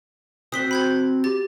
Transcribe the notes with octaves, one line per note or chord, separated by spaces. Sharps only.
C4 F#4 C5 D#6 B6 G7
B5 G6 G#6
G4 A6